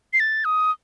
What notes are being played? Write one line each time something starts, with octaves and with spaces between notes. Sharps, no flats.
C7
A6
D#6